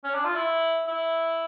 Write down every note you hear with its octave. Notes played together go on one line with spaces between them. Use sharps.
C#4
D4
F4
E4
E4